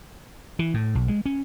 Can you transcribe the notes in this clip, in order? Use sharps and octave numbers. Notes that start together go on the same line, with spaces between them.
E3
A2
B1
G#3
C#4